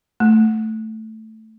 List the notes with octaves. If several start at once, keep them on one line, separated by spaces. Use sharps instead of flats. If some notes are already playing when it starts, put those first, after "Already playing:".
A3